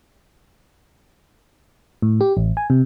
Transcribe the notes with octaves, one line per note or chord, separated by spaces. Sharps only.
A2
G4
A1
G#5
C3